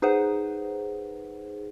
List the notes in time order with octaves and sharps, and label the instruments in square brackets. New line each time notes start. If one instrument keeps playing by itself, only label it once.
[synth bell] D#4 G#4 B4 C5 F#5